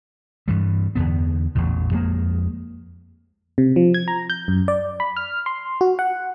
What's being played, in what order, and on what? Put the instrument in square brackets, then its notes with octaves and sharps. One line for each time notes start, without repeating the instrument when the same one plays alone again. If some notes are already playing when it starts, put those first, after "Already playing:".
[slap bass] G2 E3 G3
E2 D3 B3
A1 E2 A#2
F2 G#3 A#3
[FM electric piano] C3
F3
G#6
A#5
G6
F#2
D5
B5
F6
C6
F#4
F#5